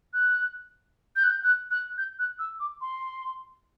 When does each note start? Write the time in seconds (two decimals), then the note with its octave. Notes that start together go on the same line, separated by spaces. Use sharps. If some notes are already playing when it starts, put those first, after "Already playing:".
0.13 F#6
1.16 G6
1.23 F#6
1.29 G6
1.43 F#6
1.71 F#6
1.98 G6
2.19 F#6
2.39 E6
2.60 D6
2.81 C6